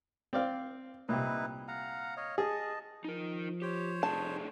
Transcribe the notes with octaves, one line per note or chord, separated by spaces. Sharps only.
C4 D5 F5
C2 A#2 D#4 E4 B4
F5 F#5 A#5
C#5 D#5 F5
G#4 D#5 A5
F3 D#4 A#4
G4 C5 C#5
F1 A3 D4 G#4 A5